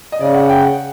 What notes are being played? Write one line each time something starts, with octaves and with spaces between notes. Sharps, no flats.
D#5
C#3 D5
F#5
G5
F#5